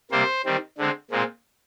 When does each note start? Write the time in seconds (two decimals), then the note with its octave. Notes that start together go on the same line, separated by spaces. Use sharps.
0.11 C3 G3 A#3 C5
0.45 D#3 G3 C4
0.78 D3 G#3 C4
1.11 A#2 G#3 C4